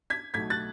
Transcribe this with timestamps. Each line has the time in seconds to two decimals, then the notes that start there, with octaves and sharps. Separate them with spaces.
0.10 G#6 B6
0.34 B1 B2 A3 G#6 B6
0.50 F#6 A6